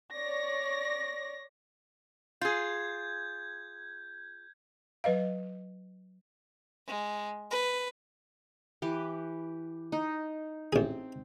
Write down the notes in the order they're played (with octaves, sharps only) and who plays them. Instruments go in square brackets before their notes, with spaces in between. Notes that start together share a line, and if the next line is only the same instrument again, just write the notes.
[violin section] C#5 D5 A#6
[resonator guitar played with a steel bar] F4 G#4 [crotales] G6 G#6
[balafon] F#3 B4 D#5 F5
[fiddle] G#3
B4
[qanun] E3 G4 B4
D#4
[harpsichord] A1 G#4 [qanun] C4